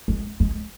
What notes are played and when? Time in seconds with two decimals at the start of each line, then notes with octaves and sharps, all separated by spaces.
0.08 G#3
0.40 G#3